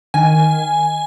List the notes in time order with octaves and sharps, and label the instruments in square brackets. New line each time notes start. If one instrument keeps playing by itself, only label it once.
[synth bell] D#3 G#5